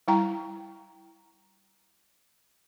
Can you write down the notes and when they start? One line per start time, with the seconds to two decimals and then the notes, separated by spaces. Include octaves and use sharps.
0.08 G3 E4 G5 A#5